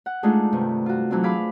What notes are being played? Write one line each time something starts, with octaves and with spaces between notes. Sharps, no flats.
F#5
G#3 A3 D4 D#4 F4 G#4
G2 C3 D#3 G3
F4 F#4
E3 F#3 A3 C4 D4
G#4 F5 B5 D6